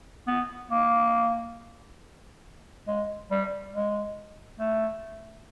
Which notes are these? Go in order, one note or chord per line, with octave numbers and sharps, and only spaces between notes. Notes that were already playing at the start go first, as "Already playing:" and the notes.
B3
A#3
G#3
G3
G#3
A3